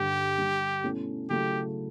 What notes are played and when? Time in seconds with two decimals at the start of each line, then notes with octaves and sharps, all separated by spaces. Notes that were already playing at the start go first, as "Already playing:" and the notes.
Already playing: G2 D3 G3 G4
0.38 D3 G3 D4
0.84 B2 A3 C#4 E4
1.30 C#3 F#3 A3 E4 G4